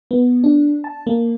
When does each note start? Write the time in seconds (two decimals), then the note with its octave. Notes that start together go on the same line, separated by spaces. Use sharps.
0.11 B3
0.44 D4
0.84 A5
1.07 A#3